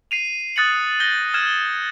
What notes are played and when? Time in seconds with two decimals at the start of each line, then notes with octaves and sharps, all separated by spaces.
0.11 C7 D#7 F7
0.56 D#6 F#6 A6 C7 C#7 F#7
1.00 G6 A#6 G7
1.34 F6 G#6 E7